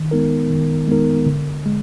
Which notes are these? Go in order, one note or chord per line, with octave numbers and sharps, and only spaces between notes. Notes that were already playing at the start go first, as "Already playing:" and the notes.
Already playing: D#3
G#3 B3 D#4 A#4
D#3
G#3 B3 D#4 A#4
D3
G#3